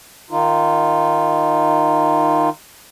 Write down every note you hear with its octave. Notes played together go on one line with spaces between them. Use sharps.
D#3 D#4 F4